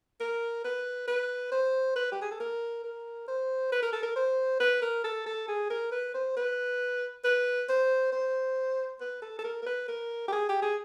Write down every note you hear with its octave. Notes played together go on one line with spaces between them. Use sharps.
A#4
B4
B4
C5
B4
G4
G#4
A4
A#4
A#4
C5
B4
A#4
A4
A#4
C5
B4
A#4
A4
A4
G#4
A#4
B4
C5
B4
B4
C5
C5
B4
A4
A4
A#4
A#4
B4
A#4
G4
G#4
G4
G#4